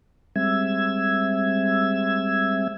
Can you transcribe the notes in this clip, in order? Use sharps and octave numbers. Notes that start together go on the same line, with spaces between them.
G3 G#3 C4 E5 E6 G#6